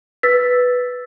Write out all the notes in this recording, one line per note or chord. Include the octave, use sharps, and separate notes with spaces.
B4 E6 A6 B6